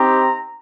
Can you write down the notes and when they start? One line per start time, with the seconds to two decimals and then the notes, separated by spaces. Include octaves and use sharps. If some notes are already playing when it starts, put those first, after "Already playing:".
Already playing: C4 D#4 G4 A#5